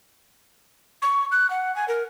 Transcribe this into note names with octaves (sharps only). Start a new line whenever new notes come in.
C#6
F#6
F#5
G#5
A#4